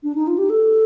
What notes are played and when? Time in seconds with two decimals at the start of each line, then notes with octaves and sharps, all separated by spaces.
0.03 D4
0.15 D#4
0.27 F4
0.38 G4
0.50 A4